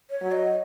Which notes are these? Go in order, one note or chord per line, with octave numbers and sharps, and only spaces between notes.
C#5
F#3
D#5